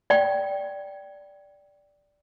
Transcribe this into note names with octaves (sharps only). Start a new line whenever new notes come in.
D5 G5